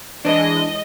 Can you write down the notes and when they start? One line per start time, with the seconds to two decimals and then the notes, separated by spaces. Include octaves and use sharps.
0.25 E3 G#3 D4 D#5